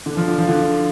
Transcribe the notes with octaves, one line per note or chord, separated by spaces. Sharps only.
D3
F3
D3
F3
D3